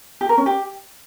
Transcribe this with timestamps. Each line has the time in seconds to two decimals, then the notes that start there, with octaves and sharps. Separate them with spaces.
0.21 G4
0.29 A#4
0.38 C#4
0.46 G4